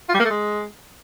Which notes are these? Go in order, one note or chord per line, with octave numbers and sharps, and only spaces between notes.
F4
G3
A#3
A3
G#3